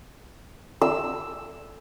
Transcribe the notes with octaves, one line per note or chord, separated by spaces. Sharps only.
E6